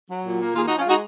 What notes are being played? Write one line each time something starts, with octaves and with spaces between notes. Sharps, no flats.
F#3
A#2
A#3
D#2 F4 G#4
D#4 F#4
F3
C#4 F4
G#3 D#4 F#4